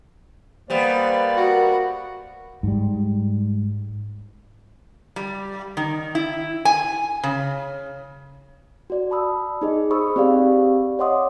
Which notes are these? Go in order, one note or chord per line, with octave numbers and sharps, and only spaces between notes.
G3 A#3 B3 C5 D5
F#4 A#4
G#2 G3
G3
D#3
E4
G#5
C#3
F#4 D5
A5 B5 D#6 E6
D#4 G#4 D#5
G#4 C5 B5 C#6 D#6 E6
C4 G4 D5 F5
C#5 D#5 F#5 C6 D6 D#6